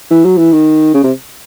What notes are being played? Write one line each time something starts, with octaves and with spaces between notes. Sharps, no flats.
E3
F#3
E3
D#3
C#3
C3